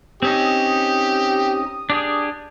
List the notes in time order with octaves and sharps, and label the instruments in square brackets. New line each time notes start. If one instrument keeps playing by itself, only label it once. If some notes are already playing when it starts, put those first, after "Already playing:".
[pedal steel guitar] C4 C#4 D#4 [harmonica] G4 [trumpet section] D#6
[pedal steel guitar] D4 G4 G#4